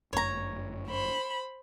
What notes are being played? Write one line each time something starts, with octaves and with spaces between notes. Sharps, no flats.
G1 F#2 A3 C#5 A#5
C5 B5